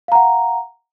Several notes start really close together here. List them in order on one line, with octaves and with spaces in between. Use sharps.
F5 A#5 F#5